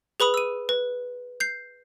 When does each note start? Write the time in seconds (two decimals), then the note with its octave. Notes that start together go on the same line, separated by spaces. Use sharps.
0.20 G#4 B4 B5 D#6
0.34 E6 D#7
0.69 B4
1.40 G6 C7